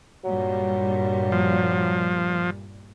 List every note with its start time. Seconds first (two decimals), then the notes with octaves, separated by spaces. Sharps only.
0.25 G2 A#2 F#3 G3
1.32 F3